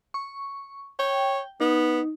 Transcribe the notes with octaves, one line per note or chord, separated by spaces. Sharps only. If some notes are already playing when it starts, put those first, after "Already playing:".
C#6
C#5 G5
B3 D#4